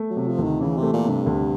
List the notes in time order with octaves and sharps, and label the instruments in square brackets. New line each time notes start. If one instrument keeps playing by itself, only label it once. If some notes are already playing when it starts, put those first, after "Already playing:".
Already playing: [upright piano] A3
[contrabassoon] F#3
[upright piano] C3
[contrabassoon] F3
[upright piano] D2
[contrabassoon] D#3
[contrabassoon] C#3 [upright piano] E3
[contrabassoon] C3
[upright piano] A3
[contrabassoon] A#2
[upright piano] C3
[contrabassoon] G2
[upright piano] D2